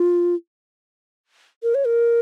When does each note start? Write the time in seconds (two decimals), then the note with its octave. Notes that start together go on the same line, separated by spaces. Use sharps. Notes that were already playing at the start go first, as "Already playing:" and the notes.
Already playing: F4
1.63 A#4
1.75 C#5
1.86 A#4